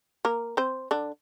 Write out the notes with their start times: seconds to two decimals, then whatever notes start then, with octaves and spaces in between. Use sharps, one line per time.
0.25 A#3 A#4
0.57 C4 C5
0.91 D3 D4